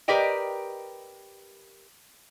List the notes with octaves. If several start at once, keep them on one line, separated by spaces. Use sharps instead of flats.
G4 A#4 B4 D5 D#5 G5